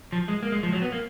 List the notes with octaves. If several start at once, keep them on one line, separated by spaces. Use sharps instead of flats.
F3
G#3
A#3
G#3
F3
F#3
B3
A#3